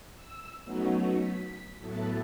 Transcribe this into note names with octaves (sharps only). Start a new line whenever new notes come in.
E6
F#3 A3 B3 C#4 D#4 F#4
B6
A2 F#3 B3 E4 A4 A5